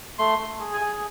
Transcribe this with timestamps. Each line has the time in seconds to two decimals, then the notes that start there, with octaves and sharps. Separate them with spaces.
0.19 A3 C6
0.39 A3
0.60 G#4
0.73 G#5
0.81 G#4